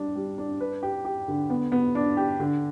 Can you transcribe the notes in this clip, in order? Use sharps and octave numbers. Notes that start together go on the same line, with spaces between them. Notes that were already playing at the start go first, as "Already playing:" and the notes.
Already playing: G3 D4
G3
D4
B4
G4
G4
D3
B3
B3
D4
G4
D3